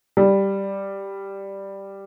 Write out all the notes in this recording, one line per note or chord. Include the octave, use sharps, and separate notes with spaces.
G3